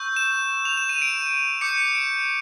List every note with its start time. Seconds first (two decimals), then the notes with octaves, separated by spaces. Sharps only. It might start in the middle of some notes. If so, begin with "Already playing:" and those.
Already playing: C#6 E6 G6
0.16 E7
0.65 F7
0.77 E7
0.89 D#7
1.02 D7
1.61 D6 G6 C#7
1.77 C#7
1.95 D7